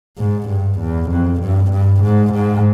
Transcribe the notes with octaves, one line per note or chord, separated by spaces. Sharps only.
G#2
G2
E2
F2
G2
G2
G#2
G#2